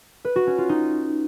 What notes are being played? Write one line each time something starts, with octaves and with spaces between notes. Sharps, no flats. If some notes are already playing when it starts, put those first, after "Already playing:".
B4
F#4
C#4
F4
D#4